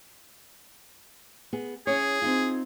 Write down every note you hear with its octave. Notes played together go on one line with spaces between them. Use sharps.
B3 G#4
C#4 E4 G#4 C#5
C4 D#4 F4